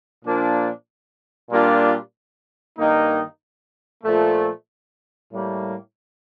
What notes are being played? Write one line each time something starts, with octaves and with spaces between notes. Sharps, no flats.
A#2 F3 A#3 D4
A#2 G3 A#3 D4 F4
G2 D#3 A#3 D#4
A#2 F3 A3
A2 G3 A#3